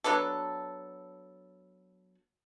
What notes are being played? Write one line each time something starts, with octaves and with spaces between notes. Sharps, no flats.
F#3 B3 D4 A4